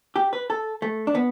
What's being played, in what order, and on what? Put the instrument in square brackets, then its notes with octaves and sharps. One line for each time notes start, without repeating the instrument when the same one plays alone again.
[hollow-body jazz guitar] G4
B4
A4
A3
D4
B3